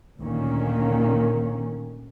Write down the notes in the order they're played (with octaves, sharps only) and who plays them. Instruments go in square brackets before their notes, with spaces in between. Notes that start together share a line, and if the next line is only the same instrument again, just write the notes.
[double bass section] D2 A#2 D#3 A#3 C#4